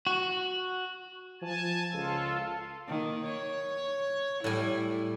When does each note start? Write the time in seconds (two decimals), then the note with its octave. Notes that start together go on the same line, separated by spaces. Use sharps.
0.07 F#4
1.42 F3 G#5 A5
1.93 C#2 F4 A4
2.88 D#3 A#3
3.25 C#5
4.44 A2 G3 E4 G#5